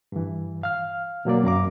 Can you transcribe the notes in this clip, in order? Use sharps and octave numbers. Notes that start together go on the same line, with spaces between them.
G2 E3
F5 F6
B2 F#3 A#3 D5
F#2 F5 A#5 D6